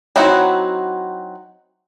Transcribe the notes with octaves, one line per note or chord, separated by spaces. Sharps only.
F#3 C4 D#4 E4 F#4